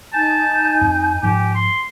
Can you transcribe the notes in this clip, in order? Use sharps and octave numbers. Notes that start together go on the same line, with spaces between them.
D#4 G#5 A5 G6
F2
G#2 F3 G4
C6